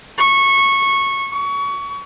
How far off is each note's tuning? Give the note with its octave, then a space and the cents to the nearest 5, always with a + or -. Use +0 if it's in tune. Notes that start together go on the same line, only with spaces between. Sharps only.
C#6 -15
C#6 +25